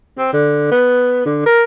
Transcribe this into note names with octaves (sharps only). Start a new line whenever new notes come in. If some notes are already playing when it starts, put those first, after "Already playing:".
C4
D3
B3
D3
A#4